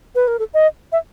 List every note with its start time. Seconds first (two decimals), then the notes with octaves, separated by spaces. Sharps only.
0.15 B4
0.28 A#4
0.39 A4
0.54 D#5
0.92 E5